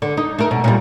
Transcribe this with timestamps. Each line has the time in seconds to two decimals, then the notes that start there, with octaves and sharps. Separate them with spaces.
0.02 D3
0.17 D#4
0.39 A3 A#4
0.51 B2
0.64 A#2 G3